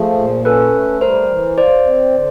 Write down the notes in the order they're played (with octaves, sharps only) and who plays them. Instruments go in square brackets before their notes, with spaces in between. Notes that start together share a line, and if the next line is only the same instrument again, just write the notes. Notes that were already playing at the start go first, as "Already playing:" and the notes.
Already playing: [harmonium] F3 A3 [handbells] G#4
[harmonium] A#2
[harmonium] C#4 [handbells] A4 B4
[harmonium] A3
[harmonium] G3 [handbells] A#4 C5
[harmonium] E3
[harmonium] F4 [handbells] C5 D5
[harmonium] C4
D3